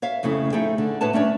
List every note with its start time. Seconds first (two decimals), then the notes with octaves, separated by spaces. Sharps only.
0.02 C#5 E5 F5
0.23 F2 C#3 A3 E4
0.53 A3 D#4 E4 G#4 G5
0.78 D3
1.01 A2 B4 C#5 A5
1.13 A3 C#4 D4 C#5